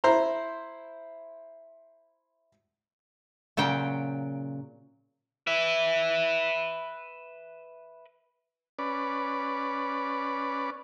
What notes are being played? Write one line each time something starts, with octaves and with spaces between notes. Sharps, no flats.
E4 C5 A#5 C6
A#2 C#3 F#3 G5
B4 E5
C#4 B4 D5